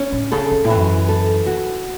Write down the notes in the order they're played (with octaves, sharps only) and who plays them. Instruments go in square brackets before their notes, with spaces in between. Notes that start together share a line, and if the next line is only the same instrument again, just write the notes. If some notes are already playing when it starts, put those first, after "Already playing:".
Already playing: [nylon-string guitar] C#4
[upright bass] A2
[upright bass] C#3 [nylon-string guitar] A4
[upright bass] F#2
A2
[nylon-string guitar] E3
[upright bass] F#2
[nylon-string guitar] A4
F#4